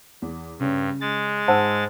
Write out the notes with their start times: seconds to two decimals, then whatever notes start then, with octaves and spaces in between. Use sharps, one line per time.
0.22 E2
0.59 G2 C#3 C#4
1.01 G#3 A6
1.48 G#2 C5 F#5 A5 E6